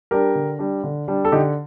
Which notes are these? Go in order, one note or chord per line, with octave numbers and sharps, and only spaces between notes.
G3 D4 G4 A#4
D3
G3 D4
D3
G3 D4
A4
D3 D#4 G4